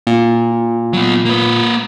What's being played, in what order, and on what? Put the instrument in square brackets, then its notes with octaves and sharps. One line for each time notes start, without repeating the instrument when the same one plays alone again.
[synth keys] A#2
[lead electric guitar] F#3 B3
A#3 B4